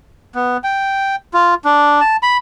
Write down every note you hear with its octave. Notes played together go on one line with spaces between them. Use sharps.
B3
G5
F4
D4
A5
B5